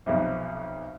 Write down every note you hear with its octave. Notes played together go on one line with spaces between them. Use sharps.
B1 F2 C3